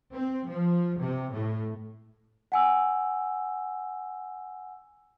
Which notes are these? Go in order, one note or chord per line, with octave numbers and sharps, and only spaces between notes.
C4
F3
C3
A2
F#5 G#5 E6